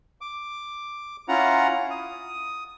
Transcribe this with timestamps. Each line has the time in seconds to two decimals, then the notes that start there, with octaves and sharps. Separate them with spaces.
0.21 D6
1.28 C#4 E4 F4 F#5 A#5
1.91 D#6